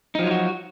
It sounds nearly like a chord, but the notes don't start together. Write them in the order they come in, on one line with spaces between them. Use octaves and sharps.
D#4 F3 F#3 F4 F#4